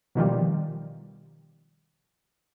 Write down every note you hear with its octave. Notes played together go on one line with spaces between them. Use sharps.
B2 D#3 F3 G3